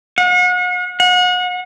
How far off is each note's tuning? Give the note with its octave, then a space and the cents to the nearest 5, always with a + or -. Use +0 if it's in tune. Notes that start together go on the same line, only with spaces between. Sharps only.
F#5 -40
F#5 -35